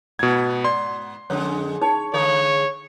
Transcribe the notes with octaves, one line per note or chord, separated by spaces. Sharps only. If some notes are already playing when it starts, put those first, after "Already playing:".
G#2 B2 B3 G#6
D5 C6
F2 D3 G#3 C#5
D#4 C#5 A5
D3 G#3 A4 C#5 E5 F5